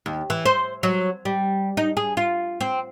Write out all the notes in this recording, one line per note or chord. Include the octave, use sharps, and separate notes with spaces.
D#2
E3
C5
F#3
G3
D#4
G#4
F4
C4